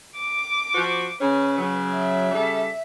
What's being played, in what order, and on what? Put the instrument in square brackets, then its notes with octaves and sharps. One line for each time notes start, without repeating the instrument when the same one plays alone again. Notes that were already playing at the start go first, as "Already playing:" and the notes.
[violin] D6
[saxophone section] F3 F#4 C5
[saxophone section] C#3 C#4 [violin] B4
[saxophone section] C#3 F#3
[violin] E5
[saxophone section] C#3 G3 A4